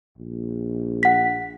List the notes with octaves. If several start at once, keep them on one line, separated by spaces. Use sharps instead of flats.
A#1
F#5 B6